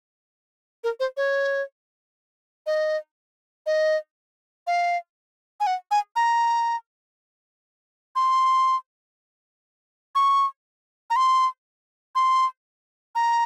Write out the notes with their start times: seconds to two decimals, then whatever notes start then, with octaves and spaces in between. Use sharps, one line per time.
0.84 A#4
1.00 C5
1.17 C#5
2.67 D#5
3.66 D#5
4.67 F5
5.60 G#5
5.67 F#5
5.91 G#5
6.16 A#5
8.16 C6
10.15 C#6
11.10 A#5
11.16 C6
12.15 C6
13.15 A#5